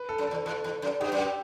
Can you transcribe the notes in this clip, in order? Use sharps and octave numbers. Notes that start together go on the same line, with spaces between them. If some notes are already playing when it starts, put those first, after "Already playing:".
Already playing: B4
A4
F#2
E2 A4
E2 A4
E2
F#2
G2 G4
F#2
G4